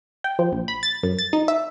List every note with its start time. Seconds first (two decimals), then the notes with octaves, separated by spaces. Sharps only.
0.24 G5
0.39 F3
0.52 A#1
0.68 B5
0.83 A6
1.03 F#2
1.19 A6
1.33 D#4
1.48 E5